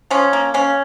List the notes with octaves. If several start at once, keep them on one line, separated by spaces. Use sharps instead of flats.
F3 C#4
A#3
C#3 C#4